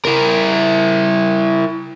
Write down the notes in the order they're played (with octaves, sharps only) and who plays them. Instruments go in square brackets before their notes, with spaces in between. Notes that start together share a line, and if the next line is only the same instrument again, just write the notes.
[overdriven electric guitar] E4 A#4